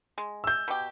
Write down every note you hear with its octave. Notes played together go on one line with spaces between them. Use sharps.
G#3
E6 G6
B2 G4